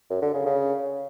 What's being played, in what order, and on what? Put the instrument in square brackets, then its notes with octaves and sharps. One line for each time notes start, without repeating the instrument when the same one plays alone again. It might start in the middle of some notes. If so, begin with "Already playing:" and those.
[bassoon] F#2
D3
C#3
C#3